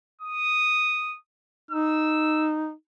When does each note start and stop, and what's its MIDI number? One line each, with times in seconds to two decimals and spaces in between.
0.21 1.15 87
1.71 2.72 63
1.71 2.50 88